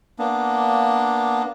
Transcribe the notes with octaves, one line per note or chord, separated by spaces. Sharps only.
A#3 B3 D4